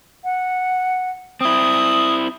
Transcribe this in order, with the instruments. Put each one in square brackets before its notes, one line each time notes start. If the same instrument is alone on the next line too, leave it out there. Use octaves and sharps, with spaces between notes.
[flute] F#5
[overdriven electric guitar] C4 E4 [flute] D#6